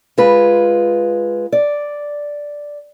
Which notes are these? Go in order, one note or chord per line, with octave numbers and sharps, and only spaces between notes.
G#3 F4 B4
D5